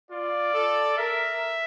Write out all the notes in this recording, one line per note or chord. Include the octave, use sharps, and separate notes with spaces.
F4 D5
A4
A#4 E5